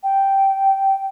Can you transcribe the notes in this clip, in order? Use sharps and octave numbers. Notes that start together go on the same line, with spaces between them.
G5